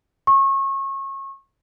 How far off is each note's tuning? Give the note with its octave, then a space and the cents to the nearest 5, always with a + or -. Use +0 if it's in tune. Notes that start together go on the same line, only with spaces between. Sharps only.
C#6 -30